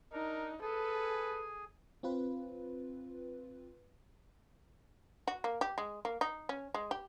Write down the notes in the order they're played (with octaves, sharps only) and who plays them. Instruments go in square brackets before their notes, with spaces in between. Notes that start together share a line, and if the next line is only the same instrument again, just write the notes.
[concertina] D4 [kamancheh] D#4 [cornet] A#4
[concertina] G#4 G#5 [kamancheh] A4 [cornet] B4
[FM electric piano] C4 F4 B4
[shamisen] F#4
A#3
G4
G#3
A#3
D#4
C#4
G#3
G4